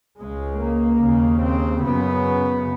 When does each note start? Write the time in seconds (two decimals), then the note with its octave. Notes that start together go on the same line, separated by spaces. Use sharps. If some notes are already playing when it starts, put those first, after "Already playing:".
0.20 C#2 C#3 G#3
0.61 A#3
1.02 D#2 C#3
1.42 C4
1.83 F#2 C#3 B3